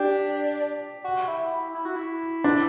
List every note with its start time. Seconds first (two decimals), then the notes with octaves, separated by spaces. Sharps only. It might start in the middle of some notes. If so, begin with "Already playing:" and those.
Already playing: D4 G4
1.04 F#4
1.28 E4
1.51 E4
1.74 E4
1.85 F#4
1.96 E4
2.44 D4